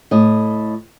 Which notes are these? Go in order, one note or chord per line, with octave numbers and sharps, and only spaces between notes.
A2 D#5